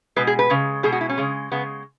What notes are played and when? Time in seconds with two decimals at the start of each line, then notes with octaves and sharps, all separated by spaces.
0.16 B2 G#3 B4
0.27 G#4
0.39 B4
0.50 C#3 G#3
0.83 B2 G#3 G#4
0.92 F#4
1.01 E4
1.09 C#4
1.18 C#3 G#3
1.52 C#3 G#3 B3